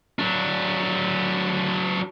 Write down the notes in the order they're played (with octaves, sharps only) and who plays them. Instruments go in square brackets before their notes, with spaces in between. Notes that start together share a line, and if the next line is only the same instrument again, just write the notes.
[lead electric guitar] F#3 D4